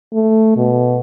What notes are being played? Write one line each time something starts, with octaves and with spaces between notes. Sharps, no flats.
A3
B2